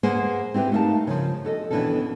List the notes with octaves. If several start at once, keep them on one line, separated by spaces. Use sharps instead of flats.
A#3 G#4 B4 C5 F#5 G#5
C4 E4 G4 B4
A3 D#4 A#4 D#5 F5 A5
C#3 F3
F#4 A4 D#5
D#2 B2 E3 C#4 D4 A4